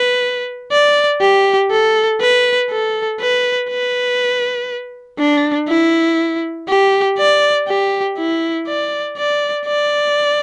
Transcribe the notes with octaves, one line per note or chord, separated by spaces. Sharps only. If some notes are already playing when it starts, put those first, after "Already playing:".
Already playing: B4
D5
G4
A4
B4
A4
B4
B4
D4
E4
G4
D5
G4
E4
D5
D5
D5